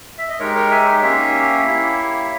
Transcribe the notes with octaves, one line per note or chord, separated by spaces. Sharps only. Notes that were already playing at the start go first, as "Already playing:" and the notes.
E5
D#5
G#3 D#4 G4 A#4 C#5
A#4 C#5
E5 G#5
A#3 C#4 G4 C#5 E5
A#3 E4 G4